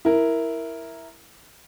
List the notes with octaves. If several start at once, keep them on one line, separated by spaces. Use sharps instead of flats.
E4 A#4